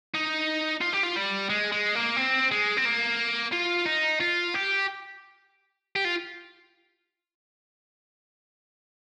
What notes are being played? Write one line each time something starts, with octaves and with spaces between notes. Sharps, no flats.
D#4
F4
G4
F4
G3
G#3
G#3
A#3
C4
G#3
C4
A#3
F4
D#4
F4
G4
G4
F4